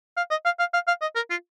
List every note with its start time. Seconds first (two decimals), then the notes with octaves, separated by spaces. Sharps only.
0.17 F5
0.31 D#5
0.45 F5
0.59 F5
0.74 F5
0.87 F5
1.02 D#5
1.15 A#4
1.30 F4